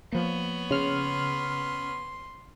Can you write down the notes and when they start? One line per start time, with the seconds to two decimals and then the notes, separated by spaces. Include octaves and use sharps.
0.12 F3 A#3 B3 C#5
0.71 C#3 C6 F6